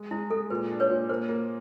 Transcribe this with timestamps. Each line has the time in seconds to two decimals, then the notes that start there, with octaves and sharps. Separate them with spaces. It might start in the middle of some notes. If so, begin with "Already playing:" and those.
Already playing: G#3
0.11 G#3 E4
0.30 G#3 A4
0.50 A#2 B4
0.71 D4
0.80 B4 C#5
0.90 A#2
1.09 A#3 C5
1.29 A#3